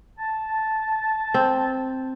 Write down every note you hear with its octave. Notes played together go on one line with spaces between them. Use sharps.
A5
C4